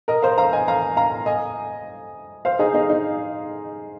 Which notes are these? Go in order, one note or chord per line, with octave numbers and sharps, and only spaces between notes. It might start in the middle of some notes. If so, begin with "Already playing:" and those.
A#4 D#5
C5 F5
F5 A#5
D#5 G#5
F5 A#5
F5 A#5
D#5 G#5
C5 F5
D#4 G#4
D#4
D#4